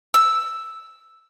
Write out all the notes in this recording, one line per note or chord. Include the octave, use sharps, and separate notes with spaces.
E6